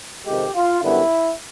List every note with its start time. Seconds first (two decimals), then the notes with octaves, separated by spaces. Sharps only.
0.25 F2 C3 D#3 G#3 G4
0.53 F4
0.81 F#2 D3 G3 B3 E4